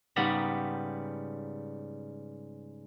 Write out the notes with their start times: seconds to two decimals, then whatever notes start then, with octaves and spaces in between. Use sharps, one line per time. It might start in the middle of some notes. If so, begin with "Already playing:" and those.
0.16 G#2 C#3 G3 B3 G4 A#5